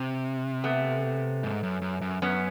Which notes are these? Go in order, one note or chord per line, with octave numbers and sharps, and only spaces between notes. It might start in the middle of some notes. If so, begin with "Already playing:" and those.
Already playing: C3
A3 B3
G#2
F#2
F#2
F#2
F#2 B3 C#4